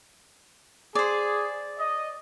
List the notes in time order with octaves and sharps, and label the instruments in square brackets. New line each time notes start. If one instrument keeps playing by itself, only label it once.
[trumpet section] G#4 [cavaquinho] C5 D5
[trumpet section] D#5